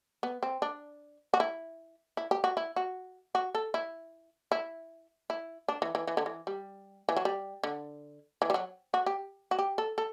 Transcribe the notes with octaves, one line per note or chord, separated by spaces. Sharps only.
B3
C4
D4
F#4
E4
E4
G4
F#4
E4
F#4
F#4
A4
E4
E4
E4
D4
E3
E3
E3
D3
E3
G3
E3
F#3
G3
D3
E3
G3
F#3
F#4
G4
F#4
G4
A4
A4